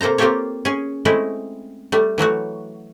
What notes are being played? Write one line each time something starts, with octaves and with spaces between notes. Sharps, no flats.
C3 A#3 A4 C5 A#5
A#3 C4 F4 G4 A4 C#5
C#4 G#4
G#3 A3 C4 C#4 E4
G3 A3
E3 F#3 A3 F#4